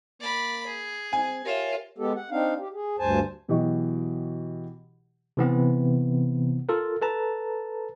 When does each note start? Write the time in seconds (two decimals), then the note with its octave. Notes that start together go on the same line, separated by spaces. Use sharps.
0.21 A#3 D5 B5
0.67 G#4
1.13 C4 G#5
1.45 F4 G4 A#4 C#5 E5
1.98 G#3 B3 G4 A4
2.15 F#5
2.31 C4 D4 D#4 F5
2.59 G4
2.74 G#4
2.99 D2 G2 C5 G#5 A5
3.48 B2 E3 F#3 G4 D#5 C#6
5.37 C3 E3 B3 C4
6.69 F4 A4 A#4
7.02 A4 B4 A5 A#5